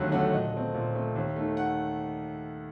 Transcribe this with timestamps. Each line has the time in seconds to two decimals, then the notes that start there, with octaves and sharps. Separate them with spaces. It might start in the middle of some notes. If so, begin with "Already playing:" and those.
Already playing: D#2 D3 F#3 A3 F#6
0.12 D3 F#3 A3 F#5
0.33 A#2 D#5
0.54 A3 C4
0.74 A#2
0.95 A3 C4
1.16 D#2
1.36 D#3 A3
1.57 F#5